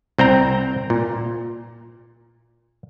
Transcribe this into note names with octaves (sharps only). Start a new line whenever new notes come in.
C2 C4 G5 A#5
A#2